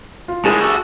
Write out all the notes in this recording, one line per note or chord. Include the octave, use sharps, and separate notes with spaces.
F4
A2 G#3 G#4 A#4 G#5
F#4 A4